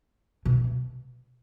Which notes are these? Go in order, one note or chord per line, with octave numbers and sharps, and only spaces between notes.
B2